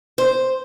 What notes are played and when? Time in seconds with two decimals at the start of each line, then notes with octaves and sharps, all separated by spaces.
0.18 C5